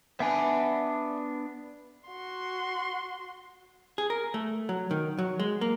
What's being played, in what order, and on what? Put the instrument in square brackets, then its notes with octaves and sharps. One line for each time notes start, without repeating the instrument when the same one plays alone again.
[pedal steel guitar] B3 D4 [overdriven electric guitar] E5 G#5
[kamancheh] F#4 C6
[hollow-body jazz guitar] G#4
A#4
A3
F#3
D#3
F#3
G#3
A#3